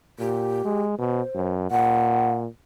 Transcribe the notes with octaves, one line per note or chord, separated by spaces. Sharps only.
A#2 G4
G#3
B2 C5
F#2
A#2 F#5